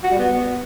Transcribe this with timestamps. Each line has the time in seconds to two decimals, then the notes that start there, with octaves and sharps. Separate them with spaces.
0.04 F#4
0.11 G3
0.19 B3